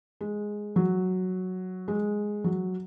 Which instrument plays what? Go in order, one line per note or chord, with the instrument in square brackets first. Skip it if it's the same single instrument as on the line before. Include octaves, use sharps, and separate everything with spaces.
[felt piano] G#3
F#3
G#3
F#3